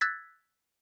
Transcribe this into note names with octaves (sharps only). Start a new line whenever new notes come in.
E6 F#6 G#6 A6 B6